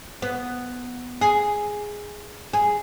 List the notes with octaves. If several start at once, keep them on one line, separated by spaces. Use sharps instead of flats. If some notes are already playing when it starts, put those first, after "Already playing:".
B3
G#4
G#4